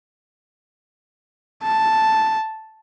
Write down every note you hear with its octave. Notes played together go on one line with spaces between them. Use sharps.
A5